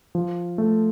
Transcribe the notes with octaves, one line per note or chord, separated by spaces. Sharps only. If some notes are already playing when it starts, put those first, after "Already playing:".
F3
A3